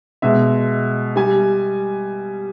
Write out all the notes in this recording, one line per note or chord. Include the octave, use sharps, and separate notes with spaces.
B2 G#3 E5
G3 G#5